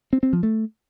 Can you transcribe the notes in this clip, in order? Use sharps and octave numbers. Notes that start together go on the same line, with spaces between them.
C4
C4
F3
A3